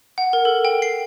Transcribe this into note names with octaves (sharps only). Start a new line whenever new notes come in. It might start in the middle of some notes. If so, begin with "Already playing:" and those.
F#5
A#4
A4
G5
C7